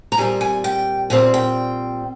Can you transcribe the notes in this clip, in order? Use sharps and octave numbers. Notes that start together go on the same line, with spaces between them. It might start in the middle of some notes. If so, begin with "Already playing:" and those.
A#5
A#2 G3 C4 G#5
G#5
G5
A#2 G3 C4 G#5
G5